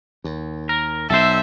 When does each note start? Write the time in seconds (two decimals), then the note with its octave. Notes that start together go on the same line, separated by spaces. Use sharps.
0.24 D#2
0.69 A#4
1.10 B1 A4 C5 E5